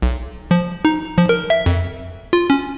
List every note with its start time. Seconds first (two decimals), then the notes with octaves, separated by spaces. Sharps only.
0.02 B1
0.51 F3
0.85 D#4
1.18 F3
1.29 A#4
1.50 E5
1.66 F2
2.33 F4
2.50 C#4